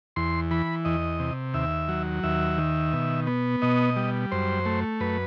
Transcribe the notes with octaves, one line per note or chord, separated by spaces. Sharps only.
E2 C6
E3 B5
E2 D#5
C3
D#2 E5
F#3
D#2 E5
D#3
B2
B3
B2 D#5
G3
F#2 C5
A3
F#2 B4